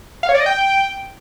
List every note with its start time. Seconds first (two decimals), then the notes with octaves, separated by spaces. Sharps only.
0.23 F5
0.29 C#5
0.35 D5
0.40 D#5
0.46 G5